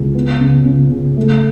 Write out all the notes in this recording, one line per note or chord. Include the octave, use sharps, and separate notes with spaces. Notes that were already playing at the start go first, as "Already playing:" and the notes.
Already playing: C#2
B3
C#3
C#3
C#3
A3